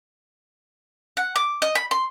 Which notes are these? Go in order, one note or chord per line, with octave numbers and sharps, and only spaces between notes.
F#5
D6
D#5
B5
C6